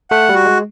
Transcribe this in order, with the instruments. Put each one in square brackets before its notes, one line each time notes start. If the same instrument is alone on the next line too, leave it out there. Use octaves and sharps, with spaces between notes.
[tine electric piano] A3 [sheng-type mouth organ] F#5
[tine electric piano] G3
[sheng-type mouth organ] F#4
[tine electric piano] G#3